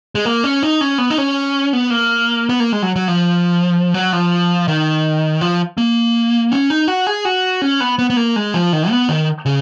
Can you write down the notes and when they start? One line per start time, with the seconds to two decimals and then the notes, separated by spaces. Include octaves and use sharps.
0.15 G#3
0.25 A#3
0.44 C#4
0.63 D#4
0.81 C#4
0.98 B3
1.10 D#4
1.18 C#4
1.73 B3
1.90 A#3
2.49 B3
2.60 A#3
2.72 G#3
2.82 F#3
2.96 F#3
3.08 F3
3.94 F#3
4.13 F3
4.68 D#3
5.41 F3
5.78 A#3
6.52 C#4
6.70 D#4
6.88 F#4
7.07 G#4
7.25 F#4
7.62 C#4
7.80 B3
7.99 B3
8.10 B3
8.17 A#3
8.36 G#3
8.54 F3
8.73 D#3
8.90 B3
9.09 D#3
9.46 C#3